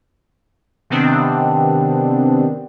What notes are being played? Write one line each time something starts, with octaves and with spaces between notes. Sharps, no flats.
C3 D#3 B3 C4 D4